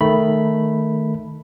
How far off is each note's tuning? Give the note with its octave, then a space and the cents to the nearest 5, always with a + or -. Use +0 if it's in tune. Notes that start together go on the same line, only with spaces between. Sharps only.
D#3 +0 A3 +0 B5 +0